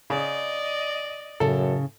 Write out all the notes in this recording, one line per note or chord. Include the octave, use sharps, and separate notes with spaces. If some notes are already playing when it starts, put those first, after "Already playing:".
C#3 D5 D#5
F#2 A2 C#3 A4